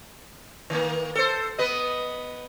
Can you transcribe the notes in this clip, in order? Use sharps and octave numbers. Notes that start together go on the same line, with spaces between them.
D#3 A#3
A4 C5
B3 B4 D#5